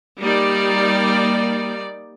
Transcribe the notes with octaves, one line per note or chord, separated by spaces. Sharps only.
G3 A#3 D#4 D5